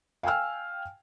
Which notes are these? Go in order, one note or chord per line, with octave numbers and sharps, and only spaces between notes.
F5 G5 G#5 E6 F6